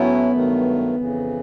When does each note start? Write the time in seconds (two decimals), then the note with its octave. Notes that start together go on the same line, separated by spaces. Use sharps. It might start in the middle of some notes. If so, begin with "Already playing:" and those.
Already playing: A2 F#3 A3 B3 C#4 E4
0.32 G2 D#3 F#3 A3
0.96 F2 C#3 E3